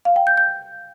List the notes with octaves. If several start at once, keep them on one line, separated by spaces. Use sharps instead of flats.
F5
G5
G6
G6